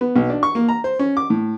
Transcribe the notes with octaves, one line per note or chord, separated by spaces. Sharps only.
B3
B1
D4
C#6
A#3
A#5
C5
C#4
D6
A2